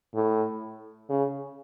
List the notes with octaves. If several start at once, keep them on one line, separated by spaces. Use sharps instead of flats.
A2
C#3